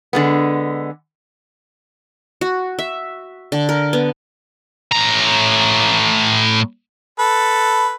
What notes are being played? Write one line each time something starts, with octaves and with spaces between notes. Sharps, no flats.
D3 G#3 B3
F#4
E5
D3
A#4
B3
A2 A#5
A4 B4